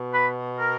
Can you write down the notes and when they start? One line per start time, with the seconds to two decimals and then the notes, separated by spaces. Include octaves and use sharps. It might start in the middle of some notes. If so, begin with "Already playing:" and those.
Already playing: B2
0.12 B4
0.59 A#4